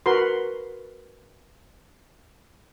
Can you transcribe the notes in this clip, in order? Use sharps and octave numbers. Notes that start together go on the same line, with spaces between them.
F#4 A#4 B4 C6